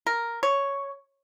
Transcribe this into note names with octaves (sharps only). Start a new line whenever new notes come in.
A#4
C#5